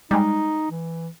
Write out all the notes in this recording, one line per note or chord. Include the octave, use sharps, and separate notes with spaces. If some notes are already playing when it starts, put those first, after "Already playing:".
G3 G#3 D#4
E3